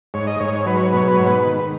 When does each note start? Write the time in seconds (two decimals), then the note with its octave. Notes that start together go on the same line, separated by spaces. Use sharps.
0.14 G#2 C#5
0.27 D#5
0.40 G#2 C#5
0.54 C#5
0.66 F#3 B4
0.77 C#5
0.87 B4
0.93 B2 C#5
1.07 B4
1.17 G#2 C#5
1.27 B4
1.45 D#3